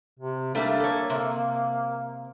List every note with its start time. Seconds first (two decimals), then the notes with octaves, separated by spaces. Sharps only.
0.19 C3
0.55 G3 A3 A#3 D4
0.80 A4 C#5
1.10 C3